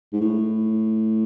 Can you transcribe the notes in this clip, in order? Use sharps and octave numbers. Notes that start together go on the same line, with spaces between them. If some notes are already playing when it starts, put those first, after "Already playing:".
G#2
A2